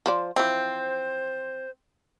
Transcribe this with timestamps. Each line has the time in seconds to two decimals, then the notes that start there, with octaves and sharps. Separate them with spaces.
0.06 F3 C5 D5
0.36 E3 F3 C4 C5